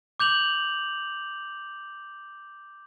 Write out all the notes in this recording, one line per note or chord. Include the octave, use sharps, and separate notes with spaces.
D6 G6 F7 F#7